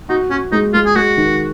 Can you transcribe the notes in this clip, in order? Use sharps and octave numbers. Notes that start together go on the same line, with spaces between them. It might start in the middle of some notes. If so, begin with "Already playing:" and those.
D#4 F#4
C#4 F#4
G#3 D#4
G#3 F4
G#4
G#3 F#4
D#3